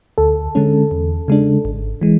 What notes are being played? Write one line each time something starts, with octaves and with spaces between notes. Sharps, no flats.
D2 A4
D3 G#3 C#4
E2
C#3 G#3 D4
G#1
E3 G#3